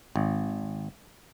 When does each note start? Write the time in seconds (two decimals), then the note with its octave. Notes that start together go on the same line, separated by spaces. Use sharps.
0.16 G#1